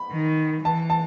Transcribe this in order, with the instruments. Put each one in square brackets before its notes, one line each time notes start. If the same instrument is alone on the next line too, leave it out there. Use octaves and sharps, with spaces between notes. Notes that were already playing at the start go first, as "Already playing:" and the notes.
Already playing: [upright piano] B5
[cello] D#3
[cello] E3 [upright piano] A5
[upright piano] A5